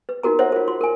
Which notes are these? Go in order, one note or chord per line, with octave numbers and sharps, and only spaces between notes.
B4
D#4 F4 F#4 A#4 A#5
C5 C#5 E5 F#5
F4 A#4
F4 C6
A#4 G#5